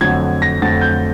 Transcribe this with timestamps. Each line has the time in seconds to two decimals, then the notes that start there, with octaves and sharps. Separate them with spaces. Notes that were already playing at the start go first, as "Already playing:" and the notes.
0.01 F2 D3 F#3 A3 G#6
0.42 A#6
0.62 F2 D3 F#3 A3 A6
0.81 G6